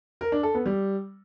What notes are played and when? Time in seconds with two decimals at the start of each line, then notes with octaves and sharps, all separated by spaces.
0.21 A#4
0.32 D4
0.43 A4
0.54 B3
0.66 G3